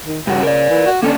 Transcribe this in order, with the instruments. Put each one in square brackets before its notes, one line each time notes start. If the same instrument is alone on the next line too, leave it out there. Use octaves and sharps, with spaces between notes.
[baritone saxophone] D#3
[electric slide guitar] G2 F#4 [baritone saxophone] C#3
[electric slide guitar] A#4 D5
[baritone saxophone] E3
F#4
[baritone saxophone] D3 [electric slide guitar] A#3 C#4 D4